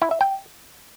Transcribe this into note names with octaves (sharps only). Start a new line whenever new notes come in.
E4
E5
G5